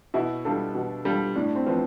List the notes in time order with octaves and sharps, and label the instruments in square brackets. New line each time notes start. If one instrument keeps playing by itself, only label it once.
[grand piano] B2 [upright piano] E4
[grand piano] G3 D4 F4 A4
B2
G3 D4 F4 A4
[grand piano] A2 [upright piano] D4
[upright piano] C4
[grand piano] F3 B3 [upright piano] C4